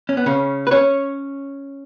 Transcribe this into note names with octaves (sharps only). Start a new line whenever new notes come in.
C#4
B3
C#3 C#4
B4
C#4 C#5